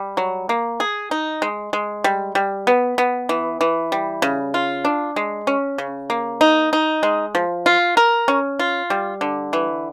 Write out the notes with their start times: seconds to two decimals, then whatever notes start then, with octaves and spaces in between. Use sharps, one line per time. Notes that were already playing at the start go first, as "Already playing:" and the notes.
Already playing: G3
0.17 F#3
0.49 A#3
0.80 G#4
1.11 D#4
1.42 G#3
1.73 G#3
2.04 G3
2.35 G3
2.67 B3
2.98 B3
3.29 E3
3.61 E3
3.92 G3
4.22 C#3
4.54 F4
4.85 D4
5.16 G#3
5.47 C#4
5.78 C#3
6.10 A#3
6.41 D#4
6.73 D#4
7.03 G#3
7.35 F3
7.66 F4
7.97 A#4
8.28 C#4
8.59 F4
8.90 G3
9.21 D3
9.53 E3